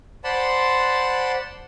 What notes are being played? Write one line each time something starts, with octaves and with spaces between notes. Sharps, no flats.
C5 D5 F#5 A5 B5 C6